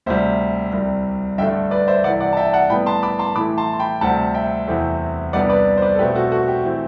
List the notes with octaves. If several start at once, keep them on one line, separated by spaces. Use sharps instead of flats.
D2 C3 G3 C5 E5
C2 C3 G3
G2 D3 A3 E5 G5
B4 D5
C5 E5
C2 C3 E3 D5 F#5
D5 F#5
A5
E5 G5
F#5 A5
A2 G3 B3 G5 B5
A5 C6
B5 D6
A5 C6
A2 E3 A3 B5 D6
A5 C6
C6
G5 B5
D2 C3 G3 C4 F#5 A5
E5 G5
E2 C3 E3 A3 C4
C2 C3 G3 B3 D4 D5 F#5
B4 D5
C5
B4 D5
A4
B2 A3 C4 G4 B4
F#4 A4
F#4 A4
G4
E3 A3 C4